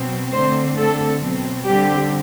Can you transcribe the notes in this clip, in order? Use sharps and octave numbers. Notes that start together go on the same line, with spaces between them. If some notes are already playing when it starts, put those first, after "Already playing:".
Already playing: B2 F#3 C4
D3 A3 C4 C5
D3 A3 C4 A4
B2 F#3 C4
D3 G3 C4 G4